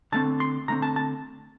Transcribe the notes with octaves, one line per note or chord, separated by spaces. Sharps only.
D3 A3 C4 A5
C6
D3 A3 C4 A#5
A5
A5